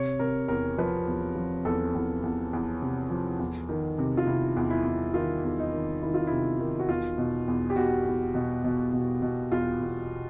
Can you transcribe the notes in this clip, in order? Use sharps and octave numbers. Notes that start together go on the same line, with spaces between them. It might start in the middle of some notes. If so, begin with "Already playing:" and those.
Already playing: C3 C#5
C3 A#4
E2 A#4
F3 B4
E2
F3
E2 A4
E2
E2
E2
C3
F3
E2
D#3
C3
F4
C3 E4
E2
E4
E2
D#3 F4
E2
D#4
D#3
D#3 E4
F4
C3 E4
D#3
F#4
E2 F4
B2
E2
G4
B2 F#4
E2
B2
B2
B2
B2
E2 F4
E2